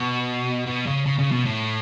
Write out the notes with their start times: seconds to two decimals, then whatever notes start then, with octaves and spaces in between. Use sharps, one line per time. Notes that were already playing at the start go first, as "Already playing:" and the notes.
Already playing: B2
0.67 B2
0.87 C#3
1.06 C#3
1.19 C#3
1.31 B2
1.45 A2